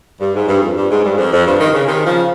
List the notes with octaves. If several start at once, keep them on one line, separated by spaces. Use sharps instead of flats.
G2
G#2
G2
F2
G2
G#2
G2
F2
F2
G2
C3 D#3
C#3
C3 D#3
C#3 F3